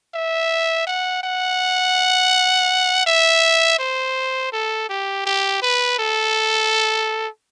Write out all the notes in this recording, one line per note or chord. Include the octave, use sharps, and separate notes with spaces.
E5
F#5
F#5
E5
C5
A4
G4
G4
B4
A4